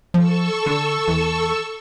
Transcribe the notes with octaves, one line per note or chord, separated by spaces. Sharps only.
F3 A4 C#6 E6
D3
E2